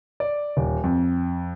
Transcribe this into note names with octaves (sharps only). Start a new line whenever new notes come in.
D5
D#1
F2